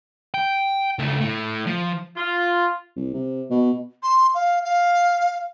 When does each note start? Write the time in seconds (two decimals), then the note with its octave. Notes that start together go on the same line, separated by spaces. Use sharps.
0.34 G5
0.99 C#2 A3
1.21 A2 A3
1.67 F3
2.16 F4
2.96 C2
3.14 C3
3.51 B2
4.03 C6
4.34 F5
4.64 F5